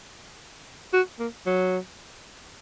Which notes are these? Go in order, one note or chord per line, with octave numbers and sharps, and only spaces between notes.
F#4
A#3
F#3